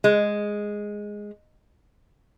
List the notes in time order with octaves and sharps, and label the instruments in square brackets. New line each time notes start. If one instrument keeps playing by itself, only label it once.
[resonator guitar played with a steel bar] G#3